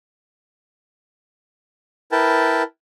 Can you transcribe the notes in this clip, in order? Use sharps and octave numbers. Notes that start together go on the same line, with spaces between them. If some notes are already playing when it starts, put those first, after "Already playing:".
E4 A#4 B4 G5 A5